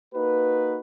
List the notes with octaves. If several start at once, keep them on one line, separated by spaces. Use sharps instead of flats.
A#3 D#4 F#4 B4